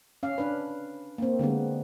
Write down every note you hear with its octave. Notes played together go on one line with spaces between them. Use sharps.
C#4 F5
D4 B4
A#3 C4
D3 G3 G#3 B3